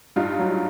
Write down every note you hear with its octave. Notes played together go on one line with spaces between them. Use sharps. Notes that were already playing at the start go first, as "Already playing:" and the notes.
G2 D#4 F4
F#3